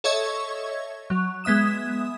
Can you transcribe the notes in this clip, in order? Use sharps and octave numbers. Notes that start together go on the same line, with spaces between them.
A4 C#5 D#5 E5 C#6 G#6
F#3
G#3 B3 E5 D#6 E7